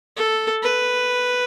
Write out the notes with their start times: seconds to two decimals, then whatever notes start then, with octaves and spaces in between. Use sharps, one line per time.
0.16 A4
0.63 B4